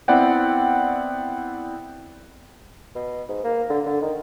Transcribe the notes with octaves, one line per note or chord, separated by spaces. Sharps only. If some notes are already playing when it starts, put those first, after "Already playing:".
B3 C4 E4 D5 F#5 G5
B2
G#2
A#3
D3
D3
D#3